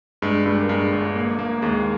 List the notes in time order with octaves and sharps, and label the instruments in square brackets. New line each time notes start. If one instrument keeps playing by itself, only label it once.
[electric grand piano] G2 [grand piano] G#3
[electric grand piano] G2 [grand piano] G3
[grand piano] A#3
[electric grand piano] G2 [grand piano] G#3
[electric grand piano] G1
A#3
A#3
[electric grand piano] D#2 [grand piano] G#3